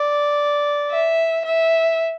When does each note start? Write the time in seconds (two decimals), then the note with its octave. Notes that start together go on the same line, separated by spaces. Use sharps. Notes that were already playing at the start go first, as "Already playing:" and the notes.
Already playing: D5
0.91 E5
1.45 E5